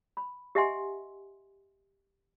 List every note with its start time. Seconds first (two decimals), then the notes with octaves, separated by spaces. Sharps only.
0.17 B5
0.55 G4 D#5 E5 F#5 G#5 C6